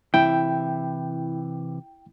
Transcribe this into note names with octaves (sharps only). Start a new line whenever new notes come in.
C3 E3 E4 G5